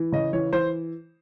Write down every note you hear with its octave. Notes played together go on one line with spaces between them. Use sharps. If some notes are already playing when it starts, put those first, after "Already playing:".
Already playing: E3
C#3 D#5
E3 C#5
E3 C5